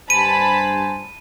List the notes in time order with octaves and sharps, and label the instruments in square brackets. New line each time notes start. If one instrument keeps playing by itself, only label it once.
[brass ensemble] G2 C5 G#5 [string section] A5 B5 [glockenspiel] D#7